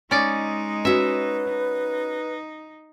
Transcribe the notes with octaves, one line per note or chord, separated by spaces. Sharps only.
G#3 C#4 D#4 D5
C#4 F#4 B4 E5
D#4